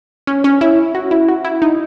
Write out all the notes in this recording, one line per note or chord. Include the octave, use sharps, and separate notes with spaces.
C#4
C#4
E4
F#4
E4
F#4
E4
D#4